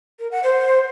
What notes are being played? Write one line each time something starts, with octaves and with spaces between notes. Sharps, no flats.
A#4
F#5
C5